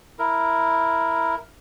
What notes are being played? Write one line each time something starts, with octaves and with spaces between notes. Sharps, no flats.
E4 A#4